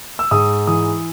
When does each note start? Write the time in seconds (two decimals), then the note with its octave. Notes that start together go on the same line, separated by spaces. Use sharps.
0.19 E6
0.31 G#2 D#6
0.67 E3 D#6